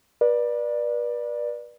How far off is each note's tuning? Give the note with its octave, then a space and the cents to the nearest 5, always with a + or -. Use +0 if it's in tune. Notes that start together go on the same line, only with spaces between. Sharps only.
B4 -35 D5 +15